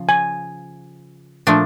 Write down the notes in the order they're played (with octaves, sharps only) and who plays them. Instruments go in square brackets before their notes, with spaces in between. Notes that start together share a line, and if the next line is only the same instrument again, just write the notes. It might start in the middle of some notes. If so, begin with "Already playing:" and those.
Already playing: [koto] C#3 F3
[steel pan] G#5
[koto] A#2 F3 A3 D4